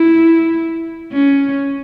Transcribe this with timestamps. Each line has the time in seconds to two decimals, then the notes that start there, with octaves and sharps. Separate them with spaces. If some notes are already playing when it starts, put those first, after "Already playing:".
Already playing: E4
1.13 C#4